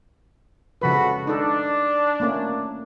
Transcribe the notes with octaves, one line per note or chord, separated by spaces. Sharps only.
C#3 F3 F#4 A4 B4 B5
D4 D#4 A4
A3 A#3 C#4